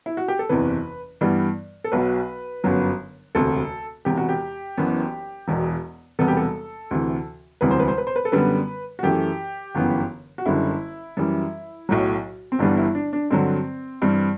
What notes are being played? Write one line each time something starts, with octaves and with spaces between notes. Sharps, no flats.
E4
F#4
G4
A4
F#1 E2 C3 E3 B4
G2 E3 G3 B3
A4
B1 B2 F#3 B4
G1 F#2 F#3 B3
E1 D2 C3 A4
E1 E2 C3 G4
F#4
G4
F#1 F#2 E3 B3
E1 E2 B2
E1 E2 C3 G3 B3 A4
G4
A4
D2 C3 E3
E1 D2 C3 E3 G3 B4
C5
B4
C5
B4
C5
B4
A4
F#2 D3 G3 B3 B4
F#4
F#2 E3 A3 G4
G1 F#2 E3 B3
F#4
F#1 F#2 D3 G3 E4
F#2 E3 G3
B1 A2 F#3
C4
G1 G2 E3 G3 B3 D4
E4
D4
D4
G2 D3 F#3 C4
G2 E3 G3 C4